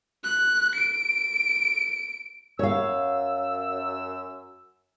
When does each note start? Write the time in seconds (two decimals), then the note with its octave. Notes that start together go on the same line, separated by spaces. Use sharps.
0.24 F#6
0.75 D7
2.59 F#2 C#5 F5 E6